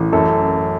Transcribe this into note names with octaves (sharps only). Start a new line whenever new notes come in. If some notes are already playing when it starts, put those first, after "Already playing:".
Already playing: A1
F#2 A4